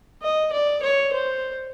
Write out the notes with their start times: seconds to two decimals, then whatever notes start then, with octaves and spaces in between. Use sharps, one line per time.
0.22 D#5
0.53 D5
0.82 C#5
1.13 C5